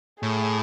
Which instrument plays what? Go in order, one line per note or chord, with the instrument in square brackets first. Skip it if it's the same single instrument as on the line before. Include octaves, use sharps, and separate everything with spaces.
[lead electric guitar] A2 [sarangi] G#4